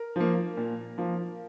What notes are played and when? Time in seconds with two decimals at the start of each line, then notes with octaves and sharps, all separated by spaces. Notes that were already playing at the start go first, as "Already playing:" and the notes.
Already playing: A#4
0.16 F3 A#3
0.57 A#2
0.98 F3 A#3